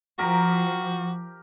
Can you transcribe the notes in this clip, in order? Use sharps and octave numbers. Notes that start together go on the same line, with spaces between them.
F3 F#4 G4 A#4 A#5